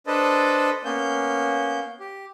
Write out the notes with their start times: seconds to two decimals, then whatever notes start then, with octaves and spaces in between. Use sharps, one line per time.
0.07 D4 A4 B4 C5 D#5 A5
0.85 A#3 B3 C#4 G6
2.00 G4